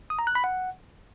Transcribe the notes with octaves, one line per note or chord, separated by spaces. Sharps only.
D#6
A#5
F#6
B5
F#5